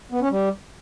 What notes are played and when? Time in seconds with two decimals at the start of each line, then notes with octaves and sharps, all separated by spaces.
0.12 B3
0.21 C#4
0.31 G3